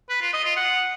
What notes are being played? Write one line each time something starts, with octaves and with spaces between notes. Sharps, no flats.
B4
F4
D#5
F4
F#5